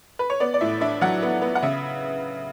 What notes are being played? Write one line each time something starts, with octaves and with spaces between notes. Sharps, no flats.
B4
C#5
B3 D5
D5
A2 E5
D4 E5
F#3 F#5
B3
B3
F#5
C#3 E5